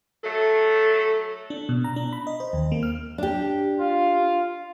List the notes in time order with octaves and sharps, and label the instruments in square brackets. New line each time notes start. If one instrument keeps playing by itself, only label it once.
[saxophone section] F#3 A3 A4
[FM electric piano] D4
B2
A#5
D4
B5
D#5
C5
D#2
A#3
F6
[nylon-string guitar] D4 G4
[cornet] F4